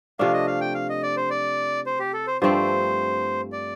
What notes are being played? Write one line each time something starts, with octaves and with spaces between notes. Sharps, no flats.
C3 F3 A3 D4 F5
D#5
F5
G5
F5
D#5
D5
C5
D5
C5
G4
A4
C5
G2 F3 A3 C4 C5
D5